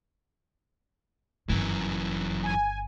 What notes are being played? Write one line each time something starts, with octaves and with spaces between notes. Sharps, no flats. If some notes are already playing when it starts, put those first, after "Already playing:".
G1 F#2 D#3 E3
G#5